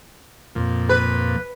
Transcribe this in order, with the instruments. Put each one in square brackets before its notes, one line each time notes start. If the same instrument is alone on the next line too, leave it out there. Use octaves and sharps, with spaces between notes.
[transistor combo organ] F2 A#2
[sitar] B4